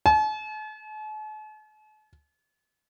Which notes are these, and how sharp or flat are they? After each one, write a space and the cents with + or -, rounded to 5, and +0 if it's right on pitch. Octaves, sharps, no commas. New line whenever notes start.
A5 -45